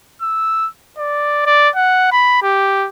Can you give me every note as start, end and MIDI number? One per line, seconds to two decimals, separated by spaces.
0.22 0.68 88
0.98 1.44 74
1.46 1.69 74
1.76 2.07 78
2.12 2.40 83
2.43 2.88 67